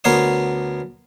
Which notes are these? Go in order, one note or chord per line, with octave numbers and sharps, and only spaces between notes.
D2 B3 A#4 C#5 C6 D#6